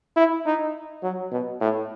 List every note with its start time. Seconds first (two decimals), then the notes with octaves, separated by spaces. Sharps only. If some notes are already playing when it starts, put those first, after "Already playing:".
0.17 E4
0.46 D#4
1.03 F#3
1.31 B2
1.61 A2